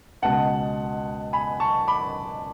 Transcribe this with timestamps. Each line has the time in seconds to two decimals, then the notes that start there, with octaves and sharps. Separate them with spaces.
0.22 C#2 B2 G#3 F#5 A5
1.33 G#5 B5
1.60 A5 C#6
1.88 B5 D6